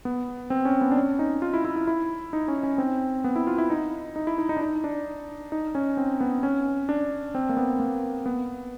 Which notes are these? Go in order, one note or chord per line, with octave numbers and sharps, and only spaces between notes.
B3
C4
C#4
B3
D4
C#4
D#4
F4
E4
E4
E4
E4
D#4
C#4
C#4
C4
B3
E4
F4
E4
D#4
D#4
E4
D#4
D#4
D4
D#4
D4
D#4
C#4
C4
B3
C#4
D4
C4
A#3
B3
A#3
B3